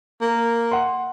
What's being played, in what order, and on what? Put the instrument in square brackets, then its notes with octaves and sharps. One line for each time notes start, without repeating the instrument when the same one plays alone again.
[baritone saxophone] A#3
[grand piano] F#5 C6